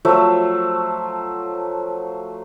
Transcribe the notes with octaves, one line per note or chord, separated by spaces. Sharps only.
F3 F#3 A3 E5